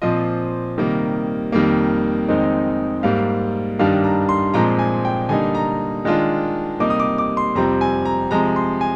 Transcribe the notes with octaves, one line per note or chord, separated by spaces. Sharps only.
A#2 F3 C4 F4 D#5
C3 D#3 G3 A#3
F2 D#3 G3 A#3
F2 D#3 G#3 C4 D#4
G#2 G3 A#3 F5
G2 D#3 G3 D4 F5
A#5
C6
A#2 F3 G#3 C4 F4 A#5
G#5
G5
D3 G3 A#3 D#4 G#5
A#5
D#3 G#3 D4 F4
C3 G3 A#3 D#4 D6
D#6
D6
D6
C6
F2 C3 G3 C4 F4 A#5
G#5
A#5
C3 F3 G#3 A#5
C6
G#5